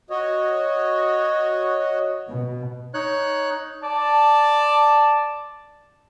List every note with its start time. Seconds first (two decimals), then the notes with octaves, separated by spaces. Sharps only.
0.10 F#4 C#5 D#5
2.28 B2
2.94 D#4 C#5 F#6
3.83 D5 A5